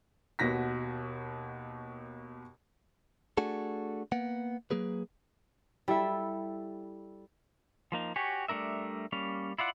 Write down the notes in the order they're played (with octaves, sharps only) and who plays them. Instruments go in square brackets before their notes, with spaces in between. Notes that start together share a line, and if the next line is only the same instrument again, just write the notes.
[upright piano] D#2 B2 F#4 A#6 B6
[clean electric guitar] A3 D4 F#4 G#4 A4
A#3 B3 F#5
F#3 A#3 G#4 B4
[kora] G3 [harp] E4 A4 E5
[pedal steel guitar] F3 A#3 D#4
F#4 G4 C#5 G#5
G3 A3 D4 A#4 E5
G3 A#3 C#4
E4 F4 D5 F#5